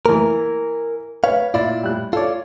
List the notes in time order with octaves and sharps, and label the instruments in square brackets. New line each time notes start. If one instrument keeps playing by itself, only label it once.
[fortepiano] E3 A#3 [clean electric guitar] A#4
[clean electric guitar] B4 F5 [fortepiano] C#5
[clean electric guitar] A#2 E4 F4 [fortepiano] D5
[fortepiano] G3 F#6
[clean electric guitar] F4 D5 [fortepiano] A4 C#5